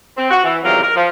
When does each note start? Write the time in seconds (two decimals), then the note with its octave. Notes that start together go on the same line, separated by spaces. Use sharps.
0.17 C4
0.30 F#4
0.43 E3
0.64 E2 C3 D#3 F#3 F4 A#4
0.82 A#4
0.96 F3